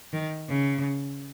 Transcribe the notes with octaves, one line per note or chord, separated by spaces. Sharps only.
D#3
C#3